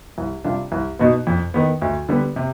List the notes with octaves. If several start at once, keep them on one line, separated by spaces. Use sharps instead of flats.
C2
C3 G3 D4 F4
C2
B2 B3 D#4
F2
D#3 B3
D2
D3 G3 B3
C3